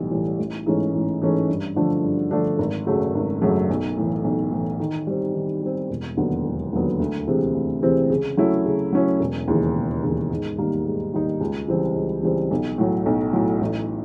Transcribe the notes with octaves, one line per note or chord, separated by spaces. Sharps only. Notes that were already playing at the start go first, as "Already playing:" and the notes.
Already playing: B1 A2 E3 G3
A2 E3 G3
A1
G#2 E3 A3 C#4
A1
G#2 E3 A3 C#4
G2
D3 F3 A3 D4
G2
D3 F3 A3 D4
G#1
F#2 C#3 F#3 A3
G#1
F#2 C#3 F#3 A3
B1
A2 E3
B1
A2 E3
D#3
G3 C4
D#3
G3 C4
E1
D#2 D3 F#3 B3
E1
D#2 D3 F#3 B3
D2
C3 E3 G#3 C4
D2
C3 E3 G#3 C4
C#3
F#3 A3 C#4 E4
C#3
F#3 A3 C#4 E4
E1
D#2 C#3 E3
E1
D#2 C#3 E3
G#2
D#3 G3 A#3 D#4
G#2
D#3 G3 A#3 D#4
C#2
C#3 E3 G3 C4
C#2
C#3 E3 G3 C4
B1
A2 F#3
B1
A2 F#3
A1